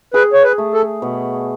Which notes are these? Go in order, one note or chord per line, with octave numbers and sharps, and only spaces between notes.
G#4 B4
C#5
B4
A3
A4
B2